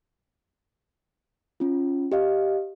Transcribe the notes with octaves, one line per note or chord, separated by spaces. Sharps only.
C#4 F4
G4 D#5 F5